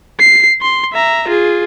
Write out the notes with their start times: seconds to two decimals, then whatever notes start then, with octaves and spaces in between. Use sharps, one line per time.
0.20 C7
0.62 C6
0.93 E5 A#5
1.28 F4 G#4